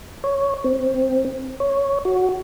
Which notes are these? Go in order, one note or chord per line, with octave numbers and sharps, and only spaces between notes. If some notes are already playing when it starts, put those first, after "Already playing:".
C#5
C4
C#5
F#4